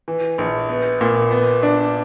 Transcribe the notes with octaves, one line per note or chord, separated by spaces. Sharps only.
E3
A#1
B3
A#2
B3
D4